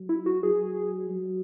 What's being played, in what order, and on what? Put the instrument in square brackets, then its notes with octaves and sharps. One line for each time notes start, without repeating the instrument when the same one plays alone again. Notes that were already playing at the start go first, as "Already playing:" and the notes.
Already playing: [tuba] F#3
[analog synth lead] E4
F#4
[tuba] F#3 [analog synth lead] G#4
[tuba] F#3